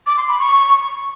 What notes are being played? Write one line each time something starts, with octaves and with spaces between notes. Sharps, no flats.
D6
C6
B5
C#6